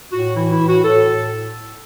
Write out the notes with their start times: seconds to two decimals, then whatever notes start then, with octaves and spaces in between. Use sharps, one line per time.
0.12 A2 F#4
0.35 E3 E4
0.51 E4
0.59 A2
0.67 F#4
0.83 A2 A4
1.07 A2